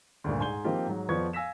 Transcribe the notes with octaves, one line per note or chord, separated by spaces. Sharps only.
D2 G2 A#2
G#2 G#5 C6 G6 G7
F3 A#3 C4 D#4 F4 G4
G#2 F#3
F2 F3 B3 D5 C#6 G#6
F5 G#5 E6 A#6 B6 E7